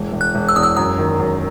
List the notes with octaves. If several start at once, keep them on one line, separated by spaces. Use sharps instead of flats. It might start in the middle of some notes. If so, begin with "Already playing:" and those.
Already playing: E1
E1
F#6
E1
E6
E2 D#6
E6
F#2 D#6
D#3
F#2